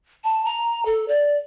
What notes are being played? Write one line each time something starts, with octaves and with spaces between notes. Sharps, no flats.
A5
A#5
A4
D5